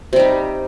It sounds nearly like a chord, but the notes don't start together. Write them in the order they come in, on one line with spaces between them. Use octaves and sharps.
C3 G3 D#4